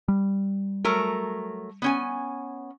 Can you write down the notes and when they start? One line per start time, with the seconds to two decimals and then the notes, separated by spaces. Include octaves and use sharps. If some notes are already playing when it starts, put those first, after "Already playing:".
0.08 G3
0.85 F#3 A3 A#4
1.82 B3 C#4 G#5